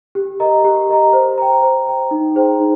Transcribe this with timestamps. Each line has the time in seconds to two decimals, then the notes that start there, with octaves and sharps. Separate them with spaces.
0.15 G4
0.40 A#4 D#5 A#5
0.65 G4
0.89 A#4 D#5 A#5
1.13 C5
1.38 G5 A#5
1.62 C5
1.86 G5 A#5
2.11 D#4
2.35 G#4 C5 G5 A#5
2.60 D#4